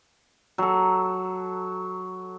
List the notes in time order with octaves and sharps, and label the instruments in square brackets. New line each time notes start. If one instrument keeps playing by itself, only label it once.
[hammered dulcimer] F#3 A4